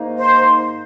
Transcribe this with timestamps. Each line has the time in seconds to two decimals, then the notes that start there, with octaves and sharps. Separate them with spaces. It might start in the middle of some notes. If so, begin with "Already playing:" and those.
Already playing: G#2 D#3 A#3 D#4
0.18 C5